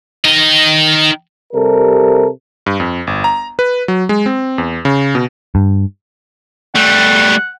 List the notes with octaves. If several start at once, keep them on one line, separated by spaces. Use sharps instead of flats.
D#3 D#5
C3 G3 A4 A#4
G2
F2
G1
A#5
B4
F#3
G#3
C4
E2
C#3
B2
G2
G3 A3 F#5